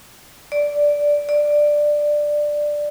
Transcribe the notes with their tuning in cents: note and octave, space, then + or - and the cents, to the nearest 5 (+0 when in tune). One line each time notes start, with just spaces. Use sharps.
D5 -5
D5 +10